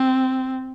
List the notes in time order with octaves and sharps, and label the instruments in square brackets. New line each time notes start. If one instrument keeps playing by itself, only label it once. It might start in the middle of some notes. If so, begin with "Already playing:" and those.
Already playing: [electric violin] C4